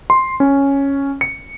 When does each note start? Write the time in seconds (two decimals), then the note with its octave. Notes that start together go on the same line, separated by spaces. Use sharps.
0.10 C6
0.40 C#4
1.21 C#7